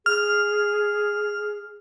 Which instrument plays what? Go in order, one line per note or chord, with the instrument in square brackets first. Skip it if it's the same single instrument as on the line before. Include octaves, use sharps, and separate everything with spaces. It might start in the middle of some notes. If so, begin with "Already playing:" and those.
[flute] G#4 [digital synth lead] F6